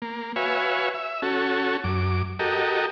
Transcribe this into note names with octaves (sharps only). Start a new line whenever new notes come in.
A#3
F#4 B4 C#5 E5 F5 G#5
E5
C#4 F#4 A4
F#2 D6
F#4 G4 A4 A#4 D#5